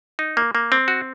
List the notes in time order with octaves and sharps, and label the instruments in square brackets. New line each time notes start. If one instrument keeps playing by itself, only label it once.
[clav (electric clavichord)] D#4
A#3
A#3
C4
F#4